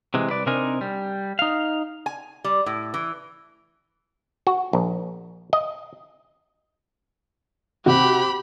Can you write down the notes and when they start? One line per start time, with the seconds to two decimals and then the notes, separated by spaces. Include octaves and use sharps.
0.14 C3 E3 G#3
0.29 C2 B4 D5
0.46 C3 C4 D4 D#4 A#4 G#5
0.81 G3
1.39 D#4 F5
2.06 G#5
2.44 G3
2.66 A2
2.94 E3
4.47 F#4
4.73 A#1
5.53 D#5
7.86 C3 F#4 G4 B5